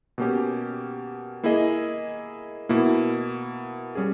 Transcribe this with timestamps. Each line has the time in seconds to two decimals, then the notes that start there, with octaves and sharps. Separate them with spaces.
0.18 B2 A#3 C#4 G4
1.43 A#3 E4 G#4 D#5
2.69 B2 A#3 E4
3.95 G3 C#4 G#4